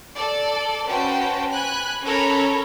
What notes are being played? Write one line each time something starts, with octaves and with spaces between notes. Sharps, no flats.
A4 D5
C#4 F#4 B4 C5 G5 A5
G#5 B5 F#6
C#4 A4 A#4 C#5 A#5 B5